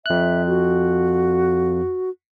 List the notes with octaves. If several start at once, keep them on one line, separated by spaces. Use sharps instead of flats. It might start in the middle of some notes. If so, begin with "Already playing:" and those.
F2 E5 F#6
F#4